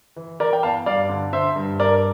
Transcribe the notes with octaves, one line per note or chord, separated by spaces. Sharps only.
E3
E3 A#4 D5
G5
E2 F5 A5
G2 D5 F5
D3
D3 C5 E5
G2
G2 A#4 D5